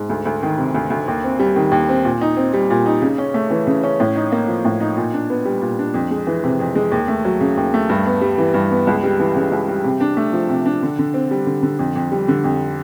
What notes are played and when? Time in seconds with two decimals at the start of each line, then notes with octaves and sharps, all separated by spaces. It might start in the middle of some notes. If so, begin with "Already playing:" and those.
Already playing: G#2
0.10 D2
0.25 D2
0.43 D#3
0.58 C3
0.75 D2
0.90 D2
1.08 D#2
1.24 C4
1.40 G3
1.56 D#3
1.72 D#2
1.89 C4
2.05 A#2
2.21 D#4
2.37 C4
2.54 G3
2.70 A#2
2.86 D#4
3.02 C#3
3.18 C#4
3.34 A3
3.50 E3
3.67 C#3
3.83 C#4
4.00 A2
4.16 D#4
4.32 A#3
4.48 F3
4.65 A2
4.80 D#4
4.97 A#2
5.13 D4
5.30 B3
5.45 G3
5.62 A#2
5.79 D4
5.94 F2
6.11 G#3
6.27 E3
6.44 C3
6.60 F2
6.75 G#3
6.92 D#2
7.08 A3
7.25 F#3
7.41 C#3
7.57 D#2
7.74 A3
7.89 G2
8.06 B3
8.22 G3
8.38 E3
8.54 G2
8.71 B3
8.87 C#2
9.04 G3
9.19 E3
9.36 C#3
9.51 C#2
9.68 G3
9.84 C3
10.00 D4
10.17 A3
10.33 F3
10.49 C3
10.66 D4
10.83 D3
10.99 D3
11.14 C4
11.31 G3
11.46 D3
11.63 D3
11.79 F2
11.95 F2
12.12 G3
12.28 D3
12.44 F2